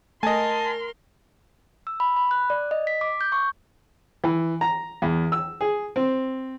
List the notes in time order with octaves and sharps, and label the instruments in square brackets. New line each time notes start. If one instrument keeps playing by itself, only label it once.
[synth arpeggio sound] A3 [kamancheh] A#4 C6 [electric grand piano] D#5 G#5 [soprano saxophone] A5
[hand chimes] E6
B5
B5
F#6
D5
D#5
B6
D6
G6
C#6
[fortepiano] E3
A#5
E2
E6
G#4
C4